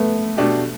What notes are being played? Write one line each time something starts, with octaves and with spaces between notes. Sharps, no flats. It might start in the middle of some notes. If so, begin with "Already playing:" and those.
Already playing: A3 B3
B2 A3 D4 G4